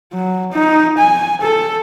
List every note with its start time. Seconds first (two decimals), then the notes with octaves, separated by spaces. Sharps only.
0.13 F#3
0.52 D#4
0.98 G#5
1.41 A4